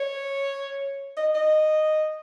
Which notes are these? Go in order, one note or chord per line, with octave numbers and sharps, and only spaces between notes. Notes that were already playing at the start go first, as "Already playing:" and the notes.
Already playing: C#5
D#5
D#5